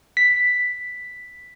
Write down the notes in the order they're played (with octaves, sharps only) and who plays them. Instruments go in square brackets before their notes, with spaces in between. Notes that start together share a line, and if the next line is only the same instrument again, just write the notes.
[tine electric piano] B6